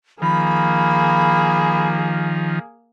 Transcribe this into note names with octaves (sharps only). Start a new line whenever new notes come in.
D#3 F3 A#3 G#4 B5